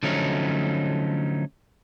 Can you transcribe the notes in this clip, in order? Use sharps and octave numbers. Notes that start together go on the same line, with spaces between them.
D3 F3 F#3 A3 C#4 D#4